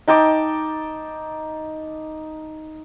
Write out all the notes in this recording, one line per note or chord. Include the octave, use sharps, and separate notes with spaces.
D#4 G5 A5 D6